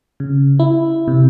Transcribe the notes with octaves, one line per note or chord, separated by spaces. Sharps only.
C#3
E4
C3